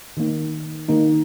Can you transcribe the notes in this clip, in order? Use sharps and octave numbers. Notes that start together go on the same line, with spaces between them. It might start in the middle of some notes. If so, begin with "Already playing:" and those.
D#3 A#3 D#4
D#3 A#3 D#4